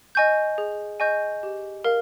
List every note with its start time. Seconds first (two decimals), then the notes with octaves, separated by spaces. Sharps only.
0.15 D#5 G#5 C#6 G6
0.58 G#4
1.00 D#5 G#5 C#6 G6
1.43 G4
1.85 A#4 F5